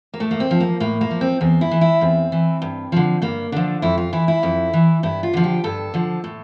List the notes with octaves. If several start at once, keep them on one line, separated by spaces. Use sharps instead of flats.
A#3
A2 A3
A#3
C4
F3
A#3
A2 A#3
A#3
F3
C4
E2 C4
E4
E3
E4
E2 C4
E3
G2
D3 F3
G2 A#3
D3 F3 D4
F2 E4
F4
E3 E4
E4
F2
E3
G2 E4
F4
D3 F3
G4
G2 A4
D3 F3
A2